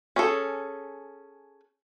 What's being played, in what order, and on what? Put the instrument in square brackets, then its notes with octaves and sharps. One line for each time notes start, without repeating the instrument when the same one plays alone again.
[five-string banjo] C#4 G#4 A4